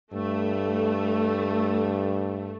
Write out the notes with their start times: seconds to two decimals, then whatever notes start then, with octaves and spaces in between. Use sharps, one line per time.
0.13 G2 A3